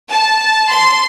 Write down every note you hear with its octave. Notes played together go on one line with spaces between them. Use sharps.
A5
C6